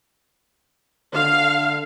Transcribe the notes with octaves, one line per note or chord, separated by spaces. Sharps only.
D3 F5